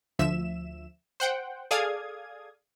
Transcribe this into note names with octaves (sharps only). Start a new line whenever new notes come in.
D2 F3 E5 E7
C5 F#5 G5
G#4 A4 D5 F5 D#6 G#6